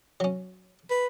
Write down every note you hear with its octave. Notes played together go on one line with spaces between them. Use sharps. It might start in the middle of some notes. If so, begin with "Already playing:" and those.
F#3 C#4
B4